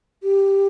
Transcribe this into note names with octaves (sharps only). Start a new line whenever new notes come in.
G4